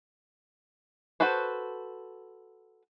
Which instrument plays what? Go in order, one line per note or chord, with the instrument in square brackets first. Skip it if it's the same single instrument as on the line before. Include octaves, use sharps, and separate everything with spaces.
[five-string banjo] F#4 A4 B4 C5